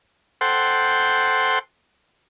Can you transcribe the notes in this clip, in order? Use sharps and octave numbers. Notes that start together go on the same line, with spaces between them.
A4 C5 F#5 G5 C6